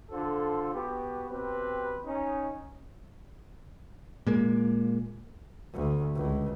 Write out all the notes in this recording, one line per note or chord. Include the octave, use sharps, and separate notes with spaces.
D3 F4 A4 C5
B3 F#4 G4
B2 C4 G4 B4
C#4 D#4
A#2 G#3 A#3
D2
C#2